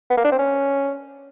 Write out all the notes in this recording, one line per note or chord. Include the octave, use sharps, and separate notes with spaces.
B3
A#3
D4
C4
C#4